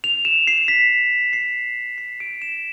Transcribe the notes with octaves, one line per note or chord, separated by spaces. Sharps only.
F7
E7
C7
B6
C7
C7
D7
E7